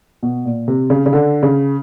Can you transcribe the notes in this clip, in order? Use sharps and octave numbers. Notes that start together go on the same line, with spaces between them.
B2
A#2
C3
C#3
C#3
D3
C#3